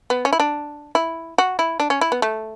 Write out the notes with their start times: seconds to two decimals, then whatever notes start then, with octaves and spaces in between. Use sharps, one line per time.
0.10 B3
0.25 C#4
0.33 E4
0.40 D4
0.95 E4
1.38 F#4
1.59 E4
1.80 D4
1.90 C#4
2.01 E4
2.12 B3
2.22 A3